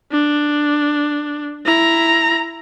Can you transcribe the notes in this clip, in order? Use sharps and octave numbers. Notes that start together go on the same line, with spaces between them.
D4
E4 A#5